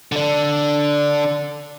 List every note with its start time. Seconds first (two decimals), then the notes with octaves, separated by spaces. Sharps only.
0.12 D3 D4